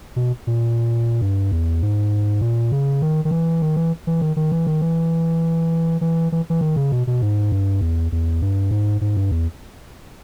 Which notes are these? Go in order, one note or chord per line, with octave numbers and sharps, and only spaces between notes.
B2
A#2
G2
E2
G#2
A#2
C#3
D#3
D#3
E3
D#3
E3
E3
D#3
D#3
E3
D#3
E3
E3
E3
E3
D#3
C#3
B2
B2
G#2
G2
E2
E2
G2
G#2
G#2
G2
E2